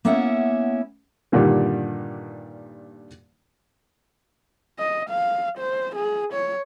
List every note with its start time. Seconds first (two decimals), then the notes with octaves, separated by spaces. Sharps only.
0.05 A#3 B3 C#4 E4 E5 F#5
1.32 G2 A#2 D3 D#3 G3
4.79 D#5
5.10 F5
5.58 C5
5.96 G#4
6.33 C#5